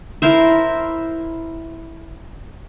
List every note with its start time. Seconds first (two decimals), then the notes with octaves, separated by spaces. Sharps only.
0.22 E4 A#4 C5 E5